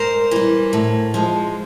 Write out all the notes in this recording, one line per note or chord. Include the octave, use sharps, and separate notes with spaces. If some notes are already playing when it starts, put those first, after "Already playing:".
Already playing: G#2 A#4 C5
E3 G3
A2
F3 G#3